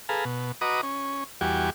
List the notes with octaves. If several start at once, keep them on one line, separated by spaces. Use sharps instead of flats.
G#4 A4 B4 F5 A#5
B2
F#4 B4 D#5 A#5 D6 D#6
C#4
E2 G3 F#4 G4 G#5